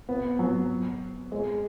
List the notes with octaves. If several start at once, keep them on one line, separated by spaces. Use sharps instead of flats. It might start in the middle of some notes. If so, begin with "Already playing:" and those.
B3
F#3
G#3